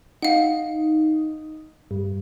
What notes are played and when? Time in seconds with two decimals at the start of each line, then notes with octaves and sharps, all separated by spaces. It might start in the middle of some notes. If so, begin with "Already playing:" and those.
0.22 D#4 F5 F#5
1.91 G2